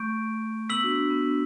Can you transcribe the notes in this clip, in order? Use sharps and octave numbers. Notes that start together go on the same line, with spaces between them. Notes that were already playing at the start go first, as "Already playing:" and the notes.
Already playing: A3 C#6 G6 D7
B3 E6 B6 F#7
D4 F#4
D4
B3
D4